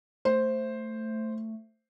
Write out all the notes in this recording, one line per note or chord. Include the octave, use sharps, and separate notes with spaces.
A3 C5